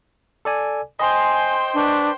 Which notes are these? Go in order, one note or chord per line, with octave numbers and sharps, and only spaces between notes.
A4 D5 G#5
C5 D#5 G5 G#5 C6
D4 B4 C#6